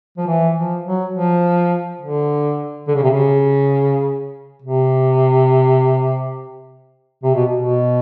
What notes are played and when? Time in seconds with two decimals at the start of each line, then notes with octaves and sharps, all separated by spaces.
0.18 F3
0.27 E3
0.56 F3
0.85 F#3
1.14 F3
2.01 D3
2.88 D3
2.95 C#3
3.03 C3
3.10 C#3
4.62 C3
7.23 C3
7.34 B2
7.55 B2